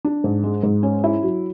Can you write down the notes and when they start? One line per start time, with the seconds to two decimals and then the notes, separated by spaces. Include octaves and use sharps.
0.05 D4
0.24 G#2
0.44 G#3
0.63 G#2
0.83 C#4
1.04 E4
1.23 F#3